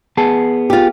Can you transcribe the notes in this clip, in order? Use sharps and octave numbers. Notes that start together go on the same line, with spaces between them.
B3 G#4 A5
F4 G4